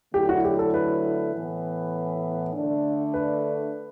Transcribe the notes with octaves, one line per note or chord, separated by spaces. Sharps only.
D3 F#3 A3 E4 G4
F#4
G4
A4
B4
A2 E3 B3
D3 A3 D4
B4